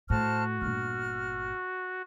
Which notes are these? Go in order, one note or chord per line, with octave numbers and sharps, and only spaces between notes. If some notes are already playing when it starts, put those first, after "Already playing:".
A2 F#4 C5 A5 F6
G1 A#2 F6